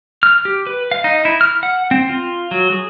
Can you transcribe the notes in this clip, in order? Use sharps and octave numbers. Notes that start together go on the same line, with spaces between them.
F6
G4
B4
F5
D#4
E4
F6
F#5
C4
F4
F#3
G#4